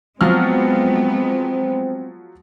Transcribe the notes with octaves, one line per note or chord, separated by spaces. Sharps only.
F3 F#3 G#3 B3 C4 F6